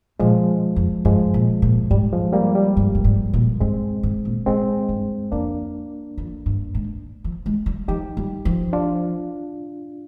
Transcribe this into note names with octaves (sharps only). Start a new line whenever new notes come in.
A#2 F3 G#3
F2
G2 F3 G#3
A#2
A#2
G#2 G3
F3 G#3
G3 A#3
G3
G2
G2
G#2
A#2
G#2 G#3 C4
G#2
A#2
G#2 G#3 C4
G2
F2 A#3 D4
F2
G2
G#2
F3
G#3
G3
F3 D#4 G4
G3
F3
D4 F4